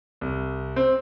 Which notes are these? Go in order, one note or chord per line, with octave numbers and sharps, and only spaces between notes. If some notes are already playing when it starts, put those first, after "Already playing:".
C2
C4